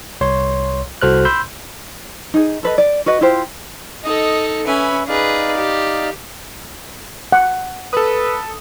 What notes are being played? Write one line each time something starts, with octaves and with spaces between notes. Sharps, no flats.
C2 C#5 C6
C2 F#4 A4 C5 F6 F#6
B5 C6 E6 G6
D#4 G#4
A4 B4 D#5
D5
F#4 B4 D#5
E4 F4 G4 C5
D#4 A4 D#5
C#4 B4 E5 G#5 B5
D#4 G#4 B4 D5 F5
G4
F#5
A4 B4 D#6